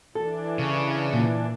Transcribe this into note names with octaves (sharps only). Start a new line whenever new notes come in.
E3 D4 A4
C#3
A#2